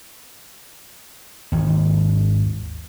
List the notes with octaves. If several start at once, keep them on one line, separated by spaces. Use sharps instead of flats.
G#1 D#2